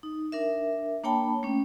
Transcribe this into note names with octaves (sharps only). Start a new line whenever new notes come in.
D#4
D4 A#4 E5
A#3 D4 C#5 G5 A5 B5
A3 C#4